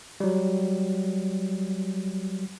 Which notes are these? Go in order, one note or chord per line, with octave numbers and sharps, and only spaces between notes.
F#3 G3